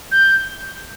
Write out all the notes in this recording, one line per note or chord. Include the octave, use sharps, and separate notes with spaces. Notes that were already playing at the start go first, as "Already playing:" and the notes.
G6